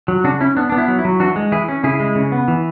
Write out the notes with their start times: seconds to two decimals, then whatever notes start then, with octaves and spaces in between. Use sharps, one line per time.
0.08 F#3
0.24 C#3 D4 F#4
0.41 C#4 E4
0.57 B3 D4
0.70 B3 D4
0.78 E4
0.88 F#3
0.99 E4
1.05 F#3
1.20 E3 D4 F#4
1.36 G#3
1.52 E3 E4 G#4
1.68 C#4
1.84 C#3 E4 G#4
2.00 G#3
2.15 C#3
2.32 B3
2.48 E3